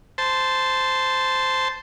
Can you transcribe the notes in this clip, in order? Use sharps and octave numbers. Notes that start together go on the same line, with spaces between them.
C5 A5